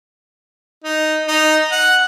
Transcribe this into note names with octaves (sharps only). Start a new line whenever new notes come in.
D#4
D#4
F#5